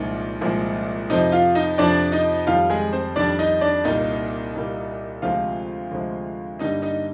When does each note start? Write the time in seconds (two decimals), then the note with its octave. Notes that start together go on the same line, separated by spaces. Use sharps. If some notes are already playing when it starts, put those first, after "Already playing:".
Already playing: C2 A#2 F3 G#3 D#4
0.41 C2 A#2 F3 G#3
1.10 F2 C3 F3 D#4 D#5
1.32 F4 F5
1.55 D#4 D#5
1.78 F2 C3 F3 D4 D5
2.12 D#4 D#5
2.47 F2 D#3 G3 F4 F5
2.69 G#3 G#4
2.93 C4 C5
3.16 F2 D#3 G3 D4 D5
3.39 D#4 D#5
3.61 D4 D5
3.84 C2 A#2 G3 A#3 D#4 D#5
4.54 C2 A#2 G3 A#3
5.22 D2 C3 F3 G#3 F4 F5
5.91 D2 C3 F3 G#3
6.59 G2 D3 G3 A#3 D#4 D#5
6.82 D#4 D#5